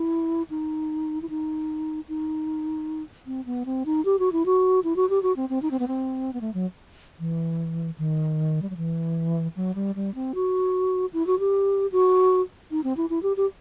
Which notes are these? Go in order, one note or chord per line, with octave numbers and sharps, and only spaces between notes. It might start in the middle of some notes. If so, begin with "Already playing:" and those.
Already playing: E4
D#4
E4
D#4
D#4
C4
B3
C4
D#4
G4
F#4
E4
F#4
E4
F#4
G4
F#4
C4
C4
D#4
C4
B3
C4
B3
A3
F#3
E3
D#3
G3
F#3
E3
F#3
G3
G3
C4
F#4
E4
F#4
G4
F#4
D#4
C4
E4
E4
G4
G4